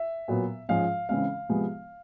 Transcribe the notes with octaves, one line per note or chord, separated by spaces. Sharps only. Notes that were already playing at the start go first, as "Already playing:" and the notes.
Already playing: E5
A#2 F#3 B3
G#2 F3 G#3 C#4 F5
C#3 E3 G#3 C4 F5
C3 F3 G#3 B3